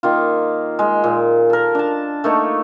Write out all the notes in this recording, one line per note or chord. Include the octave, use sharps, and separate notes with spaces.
D#3 A#3 F4
G#3
A#2
A4 A#4
D4 A5
A3 A#3 D#4 C#5